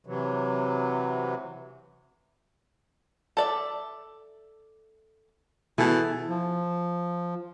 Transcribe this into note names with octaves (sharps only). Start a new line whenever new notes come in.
C3 E3 F#3
A4 D5 E5
B2 E3 G#4 A4
F3